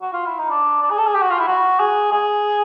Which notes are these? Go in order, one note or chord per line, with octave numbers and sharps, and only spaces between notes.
F#4
F4
E4
D#4
D4
D4
G#4
A4
G#4
G4
F#4
F4
E4
F#4
G#4
G#4